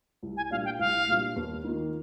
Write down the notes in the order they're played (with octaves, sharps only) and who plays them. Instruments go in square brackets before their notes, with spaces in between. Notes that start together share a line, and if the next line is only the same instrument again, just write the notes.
[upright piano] C2
[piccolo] G#5
[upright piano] A#2 G3 D4 F4 [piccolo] F5
[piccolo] G5
[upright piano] C2 [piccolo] F5
[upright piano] A#2 G3 D4 F4
D#2
D#3 A#3 F4